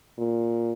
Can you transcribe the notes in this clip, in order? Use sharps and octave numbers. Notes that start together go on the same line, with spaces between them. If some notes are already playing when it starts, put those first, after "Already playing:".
A#2